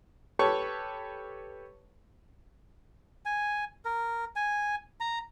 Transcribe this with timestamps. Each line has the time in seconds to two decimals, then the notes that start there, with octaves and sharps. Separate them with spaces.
0.39 G4 A4 B4 C#5 C#6
3.26 G#5
3.85 A#4
4.36 G#5
5.00 A#5